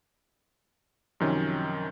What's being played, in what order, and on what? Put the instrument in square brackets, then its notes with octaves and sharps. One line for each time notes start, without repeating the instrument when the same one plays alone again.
[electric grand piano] F#2 C3 D#3 F3 C#4